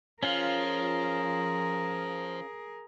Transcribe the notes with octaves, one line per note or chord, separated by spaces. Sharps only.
F3 C#4 F4 G#4 A#4 F5